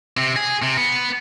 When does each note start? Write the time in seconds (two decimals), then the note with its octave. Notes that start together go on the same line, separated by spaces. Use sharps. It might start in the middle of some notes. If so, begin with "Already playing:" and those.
0.17 C3
0.36 G#4
0.62 C3
0.77 B3